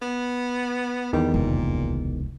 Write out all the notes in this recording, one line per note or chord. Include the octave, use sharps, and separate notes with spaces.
B3
E2 D#3 G3
F1 C#2 A#2